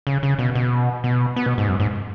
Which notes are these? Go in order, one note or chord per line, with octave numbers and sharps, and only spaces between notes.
C#3
C#3
B2
B2
B2
B3
B2
G#2
F#2
G#2